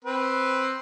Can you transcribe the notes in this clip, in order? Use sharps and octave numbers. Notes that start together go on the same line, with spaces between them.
C4 B4